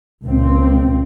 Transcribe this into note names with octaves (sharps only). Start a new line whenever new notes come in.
C#2 A#2 C4